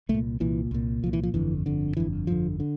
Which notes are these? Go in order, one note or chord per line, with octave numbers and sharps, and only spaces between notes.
C2 A3
A#2
C2 A#2 E3
C2 A#2
C2 A#2 F3
E3
F3
G1 F2 D3 E3
G1 F2 D3
G1 F2 D3 E3
G1 F2 D3 F3
D3